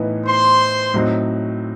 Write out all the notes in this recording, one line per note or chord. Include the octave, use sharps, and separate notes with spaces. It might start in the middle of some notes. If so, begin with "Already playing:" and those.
Already playing: A2 E3 B3 D#4
C5 C6
A2 F#3 C4 D#4